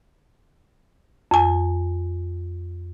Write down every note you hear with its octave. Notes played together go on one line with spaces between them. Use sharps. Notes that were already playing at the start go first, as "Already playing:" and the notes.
F2 G#5